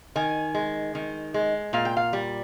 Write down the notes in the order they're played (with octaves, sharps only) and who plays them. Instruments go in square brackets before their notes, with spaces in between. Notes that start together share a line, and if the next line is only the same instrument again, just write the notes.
[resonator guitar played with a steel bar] D#3 G#5
G#3
D#3
G#3
A#2 F5
G5
F5
G3